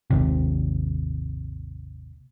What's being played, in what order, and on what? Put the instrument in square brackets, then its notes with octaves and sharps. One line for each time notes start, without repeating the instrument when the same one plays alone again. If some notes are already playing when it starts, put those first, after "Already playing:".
[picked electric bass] G#1 D#2 C3